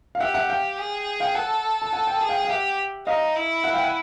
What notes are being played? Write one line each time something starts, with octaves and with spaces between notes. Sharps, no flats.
F5
G4 E5 F#5
E5 F#5
F5 G5
G#4
F5 G5
A4 F#5 G#5
A5
F#5 G#5
G5
G#4 G#5
F5 G5
F5
G4 E5 F#5
D#4 D#5 F5
E4
E5 F#5
F5 G5
F#5 G#5